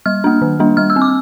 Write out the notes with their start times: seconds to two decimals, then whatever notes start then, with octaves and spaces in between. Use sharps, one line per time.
0.06 G3 F6
0.24 A#3 D4
0.42 D#3
0.60 G3 A#3 D4
0.77 G3 F6
0.90 E6
0.96 C4
1.02 D6